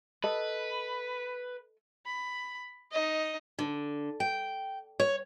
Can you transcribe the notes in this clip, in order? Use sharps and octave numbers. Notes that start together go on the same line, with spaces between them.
A4 B4 D#5
B5
D#4 D#5
D3
G5
C#5